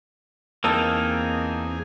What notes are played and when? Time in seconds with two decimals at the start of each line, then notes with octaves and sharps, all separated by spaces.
0.64 E2 A#3 C4 D#4 G#4 A5 D#6 E6